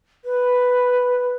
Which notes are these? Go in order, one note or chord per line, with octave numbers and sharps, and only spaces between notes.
B4